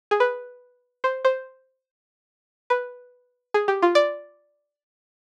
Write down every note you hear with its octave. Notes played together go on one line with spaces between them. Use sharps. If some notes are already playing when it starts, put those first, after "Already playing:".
G#4
B4
C5
C5
B4
G#4
G4
F4
D5